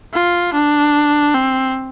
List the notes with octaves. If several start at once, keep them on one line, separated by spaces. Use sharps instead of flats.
F4
D4
C4